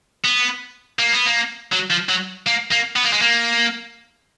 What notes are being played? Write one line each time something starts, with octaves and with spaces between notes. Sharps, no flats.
B3
A#3
B3
A#3
F#3
F3
F#3
A#3
A#3
B3
A#3
G#3
A#3